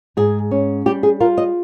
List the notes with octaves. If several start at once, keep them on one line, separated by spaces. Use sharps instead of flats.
G#2 G#4
C#4
G3 G4
G#4
F4 A#4
D#5